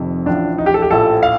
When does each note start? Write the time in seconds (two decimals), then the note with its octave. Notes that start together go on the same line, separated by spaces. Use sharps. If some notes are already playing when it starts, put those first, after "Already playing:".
Already playing: F1 F2 C3 D#3
0.26 A1 A2 F3 D4
0.58 D#4
0.66 G4
0.74 A4
0.82 G4
0.90 A#1 A2 F3 A4
1.23 F5